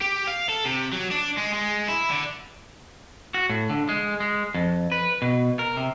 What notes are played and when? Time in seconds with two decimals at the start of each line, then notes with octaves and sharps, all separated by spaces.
0.01 G4
0.27 F5
0.49 A4
0.65 C3
0.93 F#3
1.11 D4
1.38 G#3
1.54 G#3
1.88 E4
2.10 D3
3.34 F#4
3.49 A2
3.69 D3
3.89 G#3
4.20 G#3
4.54 F2
4.92 B4
5.22 B2
5.59 A#4
5.77 C3